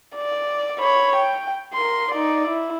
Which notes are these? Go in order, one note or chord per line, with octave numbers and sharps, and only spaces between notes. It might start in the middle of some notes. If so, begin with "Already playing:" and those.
D5
C#5 B5
G5
A#4 C6
D#4 D5
E4